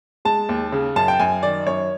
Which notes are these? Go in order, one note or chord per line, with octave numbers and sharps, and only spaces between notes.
G#3 A5
D#2
C#3
F#2 A5
G5
F#2 G#5
D#3 D5
F#2 C#5